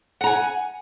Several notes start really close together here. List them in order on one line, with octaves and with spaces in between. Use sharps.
F#5 A#5 G#5